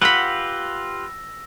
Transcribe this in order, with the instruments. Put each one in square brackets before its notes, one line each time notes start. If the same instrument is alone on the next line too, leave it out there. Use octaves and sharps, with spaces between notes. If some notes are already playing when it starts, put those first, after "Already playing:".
[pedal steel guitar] F4 G4 B4 [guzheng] F#5 B5 [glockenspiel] E6 A#6